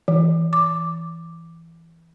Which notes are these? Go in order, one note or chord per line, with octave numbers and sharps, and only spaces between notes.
E3
D6